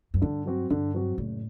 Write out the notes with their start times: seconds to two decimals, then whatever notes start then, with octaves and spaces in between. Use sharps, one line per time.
0.14 F#2
0.22 G2 D3
0.46 F#3 C4 F#4
0.70 G2 D3
0.94 F#3 C4 F#4
1.18 F#1 A2